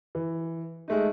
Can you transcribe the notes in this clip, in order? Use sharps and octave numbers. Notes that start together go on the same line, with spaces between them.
E3
G#3 A3 D#4